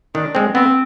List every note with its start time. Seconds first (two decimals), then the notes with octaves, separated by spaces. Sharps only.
0.15 D#3 D4
0.35 G#3 C4
0.54 B3 C4